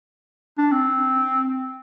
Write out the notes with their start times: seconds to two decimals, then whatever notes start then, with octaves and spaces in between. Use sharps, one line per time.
0.58 D4
0.72 C4